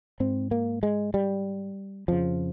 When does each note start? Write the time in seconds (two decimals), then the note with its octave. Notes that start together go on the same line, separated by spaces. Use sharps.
0.20 G#2 C4
0.51 A#3
0.83 G#3
1.14 G3
2.08 F2 C#3 F3